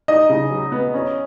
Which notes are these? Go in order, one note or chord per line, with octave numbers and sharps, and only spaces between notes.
D#4 D#5
C#3
F#3
B3
C#4